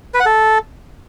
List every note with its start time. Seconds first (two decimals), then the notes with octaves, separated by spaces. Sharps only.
0.14 B4
0.20 F#5
0.26 A4